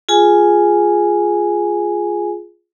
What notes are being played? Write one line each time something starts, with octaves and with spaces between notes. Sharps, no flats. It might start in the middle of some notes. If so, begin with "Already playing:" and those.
F4 G#4 G#5